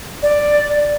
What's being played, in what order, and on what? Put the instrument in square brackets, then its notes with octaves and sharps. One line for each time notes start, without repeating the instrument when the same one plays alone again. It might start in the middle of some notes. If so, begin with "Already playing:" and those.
[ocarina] D5